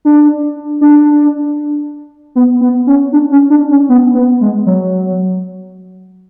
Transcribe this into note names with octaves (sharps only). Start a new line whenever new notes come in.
D4
D4
B3
B3
C#4
D4
C#4
D4
C#4
B3
B3
G#3
F#3